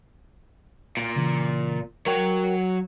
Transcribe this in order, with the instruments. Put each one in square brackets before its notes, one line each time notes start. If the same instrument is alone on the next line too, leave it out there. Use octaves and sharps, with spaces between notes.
[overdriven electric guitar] A#2
[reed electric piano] C#3 E3
[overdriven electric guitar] F#3 C#5 [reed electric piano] A#4 G5